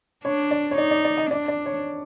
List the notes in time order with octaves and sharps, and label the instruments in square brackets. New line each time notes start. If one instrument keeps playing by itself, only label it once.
[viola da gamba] D4 [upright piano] C#5
[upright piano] D5
C#5
[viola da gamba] D#4 [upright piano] D5
[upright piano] D5
D5
D#5
[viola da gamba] D4 [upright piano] D5
[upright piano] D5
C#5